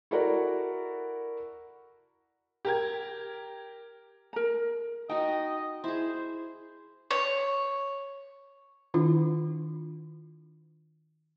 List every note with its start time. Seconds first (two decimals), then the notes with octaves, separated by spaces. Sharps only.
0.11 E4 F#4 A4 A#4 D5 F#5
2.65 G4 A#4 G#6
4.33 A#4 A#5
5.09 D#4 F#4 D#5 G5
5.84 E4 G#4 C5
7.11 C#5
8.94 D#3 D4 E4 F4